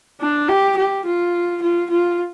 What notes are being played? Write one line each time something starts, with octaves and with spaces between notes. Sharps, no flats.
D4
G4
G4
F4
F4
F4